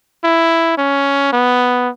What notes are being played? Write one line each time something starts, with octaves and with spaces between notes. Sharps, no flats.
E4
C#4
B3